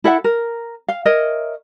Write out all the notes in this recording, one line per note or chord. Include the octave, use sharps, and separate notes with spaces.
E4 A4 E5 F#5
A#4
F5
A#4 C#5 D#5 E5